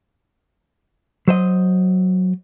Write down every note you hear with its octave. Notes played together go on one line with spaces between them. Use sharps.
F#3 C5 D#5